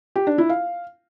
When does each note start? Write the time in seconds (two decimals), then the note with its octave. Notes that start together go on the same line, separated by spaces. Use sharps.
0.16 G4
0.27 D4
0.38 E4
0.49 F5